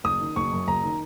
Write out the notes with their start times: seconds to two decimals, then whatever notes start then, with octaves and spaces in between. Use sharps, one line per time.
0.04 F#1 D#6
0.20 D#3
0.36 F#1 C#6
0.52 F#2
0.67 F#1 A#5
0.83 D#3